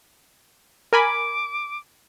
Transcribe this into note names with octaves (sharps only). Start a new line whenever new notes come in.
A#4 G#5 B5 D6